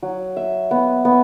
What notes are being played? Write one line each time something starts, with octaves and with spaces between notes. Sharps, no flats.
F#3
E5
B3
B3